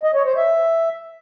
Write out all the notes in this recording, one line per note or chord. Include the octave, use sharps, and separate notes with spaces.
D#5
C#5
C5
E5